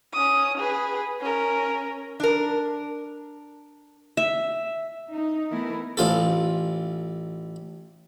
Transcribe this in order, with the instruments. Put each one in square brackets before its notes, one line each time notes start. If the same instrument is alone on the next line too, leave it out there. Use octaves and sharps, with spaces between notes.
[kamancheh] C#4 D#6
G#4 B4
C#4 A#4
[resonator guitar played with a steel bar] D4 A#4
[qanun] E5
[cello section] D#4
E3 A3 B3 E4 A#4
[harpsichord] A1 F4 A4